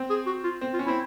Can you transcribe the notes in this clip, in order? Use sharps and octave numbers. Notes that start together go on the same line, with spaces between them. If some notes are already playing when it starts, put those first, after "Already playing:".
Already playing: C4
G#4
F#4
F4
C4
F4
C#4
C4 E4